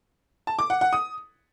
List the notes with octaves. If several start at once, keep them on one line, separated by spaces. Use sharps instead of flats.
A5
D6
F#5
F#5
D#6